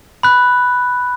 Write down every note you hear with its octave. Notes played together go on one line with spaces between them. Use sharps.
B5 F#6